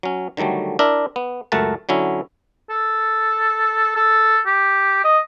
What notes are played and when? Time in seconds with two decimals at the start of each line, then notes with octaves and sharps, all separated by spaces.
0.03 F#3 C#4
0.37 D3 D#3 F#3 G3 A3
0.79 D4 E4 A#4 E5
1.16 B3
1.52 C#2 F#2 A3 A#4 F#5 A5
1.89 D3 F#3 C#4 E4
2.70 A4
3.96 A4
4.46 G4
5.04 D#5